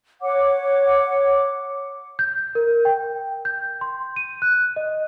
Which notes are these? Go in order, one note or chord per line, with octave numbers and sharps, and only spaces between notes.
C#5 F#5 D6
G6
A#4
G5
G6
C6
D#7
F#6
D#5